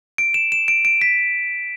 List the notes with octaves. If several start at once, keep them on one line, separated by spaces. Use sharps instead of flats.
D7
E7
E7
D7
D7
B6